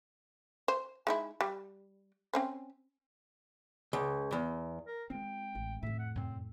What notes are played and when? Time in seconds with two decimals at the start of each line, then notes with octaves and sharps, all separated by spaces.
0.68 C5
1.07 G#3 D#4 E4
1.41 G3
2.33 C4 C#4 C5
3.93 C#2
4.32 E2
4.87 A#4
5.10 G#3 C4 F4 G5
5.55 A1
5.83 F2 A2 E5
5.99 F#5
6.15 F#2 C3 C4